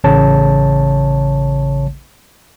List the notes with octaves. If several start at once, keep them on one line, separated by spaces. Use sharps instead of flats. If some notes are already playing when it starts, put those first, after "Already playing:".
A1 C#3 C#5 A5